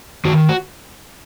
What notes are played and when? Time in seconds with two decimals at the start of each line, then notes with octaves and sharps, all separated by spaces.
0.25 D#3 F#4
0.49 F#4